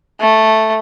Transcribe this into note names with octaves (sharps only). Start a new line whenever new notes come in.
A3